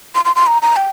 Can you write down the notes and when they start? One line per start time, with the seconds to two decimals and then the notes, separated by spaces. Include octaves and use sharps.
0.15 C6
0.25 C6
0.36 C6
0.47 A#5
0.62 A#5
0.76 G5